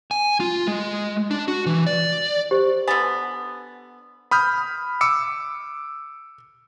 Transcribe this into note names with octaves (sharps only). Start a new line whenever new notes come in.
G#5
F4
G#3
D4
F#4
E3
D5
G4 C5
D3 B3 G#5 A6
B5 D#6 F6 G6
D6 E6 C#7